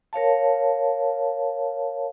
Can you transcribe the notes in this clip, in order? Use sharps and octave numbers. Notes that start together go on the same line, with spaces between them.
A#4 C#5 F5 A5